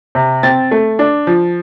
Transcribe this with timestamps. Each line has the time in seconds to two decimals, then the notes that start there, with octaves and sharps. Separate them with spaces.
0.15 C3
0.43 C4 A6
0.71 A3
0.99 D4
1.27 F3